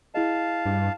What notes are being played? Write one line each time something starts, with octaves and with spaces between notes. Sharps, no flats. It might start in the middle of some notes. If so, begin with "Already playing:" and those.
E4 G#4 D#5 F5 A5
G2